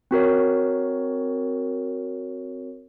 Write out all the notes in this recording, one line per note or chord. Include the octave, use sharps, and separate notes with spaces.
C4 F#4 A#4 C#5